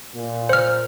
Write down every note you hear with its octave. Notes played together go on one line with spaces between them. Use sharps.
A#2
C5 F6